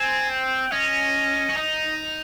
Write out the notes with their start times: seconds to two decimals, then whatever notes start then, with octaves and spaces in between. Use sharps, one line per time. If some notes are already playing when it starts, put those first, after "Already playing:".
Already playing: C4 G#5
0.30 G5
0.72 C#4 D#5
1.49 C#4
1.57 D#4 D#5